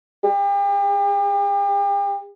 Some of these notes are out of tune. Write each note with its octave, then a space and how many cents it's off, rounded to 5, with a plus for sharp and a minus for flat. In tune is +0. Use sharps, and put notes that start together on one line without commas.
G4 +35